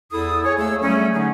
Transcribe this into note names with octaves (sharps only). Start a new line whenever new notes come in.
E2 E4 A4 D#6
G#4 C#5
D#2 A3 G#4 E6
F#3 G3 A3 C#4
D3 F#3 A3 C#4 D#4 G#4